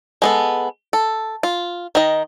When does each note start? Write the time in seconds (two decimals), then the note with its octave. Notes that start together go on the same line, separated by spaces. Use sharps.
0.22 G#3 B3 A4
0.93 A4
1.43 F4
1.95 D#3 D#5